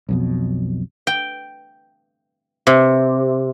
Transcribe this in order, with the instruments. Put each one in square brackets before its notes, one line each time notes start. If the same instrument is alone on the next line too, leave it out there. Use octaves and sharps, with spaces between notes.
[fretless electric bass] B1 F2 B2
[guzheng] G5
C3